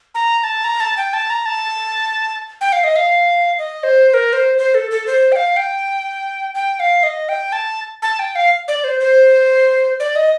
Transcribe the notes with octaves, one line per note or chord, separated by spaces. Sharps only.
A#5
A#5
A5
A#5
A5
G5
A5
A#5
A5
G5
F5
D#5
F5
D#5
C5
C5
A#4
C5
C5
A4
A4
C5
G5
F5
G5
G5
F5
D#5
G5
A5
A5
G5
F5
D5
C5
C5
D5
D#5